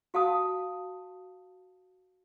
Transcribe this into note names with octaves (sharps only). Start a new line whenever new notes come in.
F#4 F5 A5 D#6